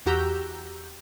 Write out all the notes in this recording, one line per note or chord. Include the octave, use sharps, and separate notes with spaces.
E2 F#4 G4 A#5 E6 G6